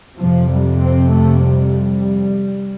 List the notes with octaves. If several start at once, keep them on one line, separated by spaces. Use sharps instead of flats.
F2 C3 F3
G3
C4
A3
G3